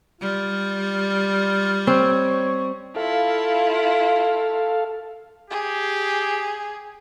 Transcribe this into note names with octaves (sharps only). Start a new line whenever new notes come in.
G3 F4
C4 C#5
E4 F4 A4 F5
G4 G#4